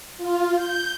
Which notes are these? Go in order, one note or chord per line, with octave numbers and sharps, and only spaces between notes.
F4
G6